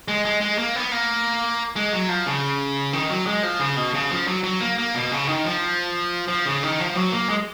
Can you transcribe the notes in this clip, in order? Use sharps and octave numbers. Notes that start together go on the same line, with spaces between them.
G#3
G#3
G#3
A#3
B3
A#3
G#3
F#3
F3
C#3
D#3
F#3
G#3
F3
C#3
B2
C#3
F3
F#3
F#3
A#3
A#3
B2
C#3
D#3
F3
F3
C#3
D#3
F3
F#3
A#3
G#3